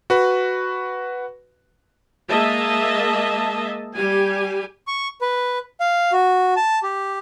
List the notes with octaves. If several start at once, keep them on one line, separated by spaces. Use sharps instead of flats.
F#4 B4
G#3 A#3 D#5 E5 A5
G3 G4 G#5
C#6
B4
F5
F#4
A5
G4